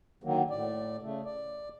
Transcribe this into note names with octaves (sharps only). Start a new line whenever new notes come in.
D3 D#3 F#3 A#3
A2 D5
C#3 A3
D5